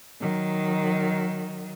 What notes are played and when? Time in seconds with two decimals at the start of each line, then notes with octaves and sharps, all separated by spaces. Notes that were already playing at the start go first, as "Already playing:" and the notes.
0.21 D#3 F#3